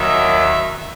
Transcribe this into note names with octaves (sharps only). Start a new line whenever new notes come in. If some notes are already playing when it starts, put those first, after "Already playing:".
Already playing: D#2 D#3 F#3 E5